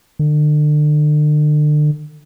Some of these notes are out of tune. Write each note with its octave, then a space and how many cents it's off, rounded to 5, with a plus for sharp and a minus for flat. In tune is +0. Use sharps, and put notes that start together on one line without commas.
D3 +35